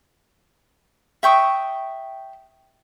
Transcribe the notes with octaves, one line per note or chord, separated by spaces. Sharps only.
E5 G5 C#6 D#6